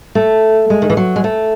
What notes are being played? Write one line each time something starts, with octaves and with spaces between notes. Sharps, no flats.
A3
G#3
D#3
E3
F#3
G#3
A3